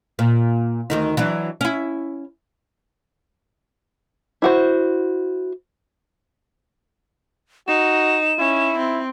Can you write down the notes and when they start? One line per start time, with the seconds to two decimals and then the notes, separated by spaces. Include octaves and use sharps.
0.19 A#2
0.90 D2 D#3 D#4
1.17 E3 F#3 D4
1.61 C#4 E4
4.42 E4 F#4 C5
7.68 D#4 F#4 E7
8.39 C#4 E4
8.78 C4